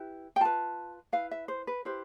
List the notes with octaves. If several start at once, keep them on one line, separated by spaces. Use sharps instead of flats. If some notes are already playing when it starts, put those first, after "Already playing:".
Already playing: E4 G4 B4
G5
F4 B4 A5
E4 B4 F5
E5
C5
B4
E4 G4 B4 C5